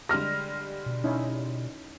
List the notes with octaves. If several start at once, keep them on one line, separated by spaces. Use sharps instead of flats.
D3 G3 G#3 F6 A#6
B2
C#4 D#4 E4